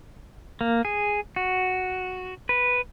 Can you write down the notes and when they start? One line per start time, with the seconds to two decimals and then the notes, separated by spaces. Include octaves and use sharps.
0.61 A#3
0.85 G#4
1.36 F#4
2.49 B4